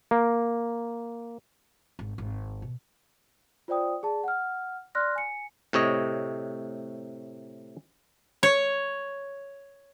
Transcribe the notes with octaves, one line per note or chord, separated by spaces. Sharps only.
A#3
G#1
G#1
B2
F4 C5 D5 G5 D#6
G#4 D5 A5
F#5 F6
D5 C6 F6 F#6 A#6
G#5 C#7
A2 C3 C#5 D#5
C#5